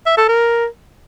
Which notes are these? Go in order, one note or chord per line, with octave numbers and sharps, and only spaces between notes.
E5
A4
A#4